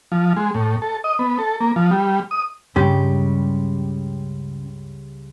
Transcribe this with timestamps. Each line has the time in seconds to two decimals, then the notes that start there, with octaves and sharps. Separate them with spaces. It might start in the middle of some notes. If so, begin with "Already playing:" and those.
0.12 F3
0.36 G#3
0.54 A2
0.82 A4
1.04 D#5
1.19 B3
1.39 A4
1.60 A#3
1.76 F3
1.91 G3
2.31 D#6
2.76 C#2 G2 C#3 G3 G4